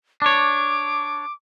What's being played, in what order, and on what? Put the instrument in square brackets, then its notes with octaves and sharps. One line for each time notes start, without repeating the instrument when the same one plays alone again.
[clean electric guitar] D4 C#5 [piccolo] D6